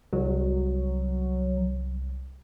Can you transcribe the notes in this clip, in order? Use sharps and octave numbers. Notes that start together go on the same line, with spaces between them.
C2 F#3